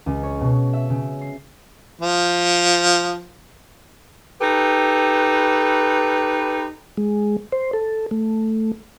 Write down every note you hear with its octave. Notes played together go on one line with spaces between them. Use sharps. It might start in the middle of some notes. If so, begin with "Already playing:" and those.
C#2
C#5
B2
E5
C#3
C7
F3
D#4 G4 A4 B4
G#3
C5
A4
A3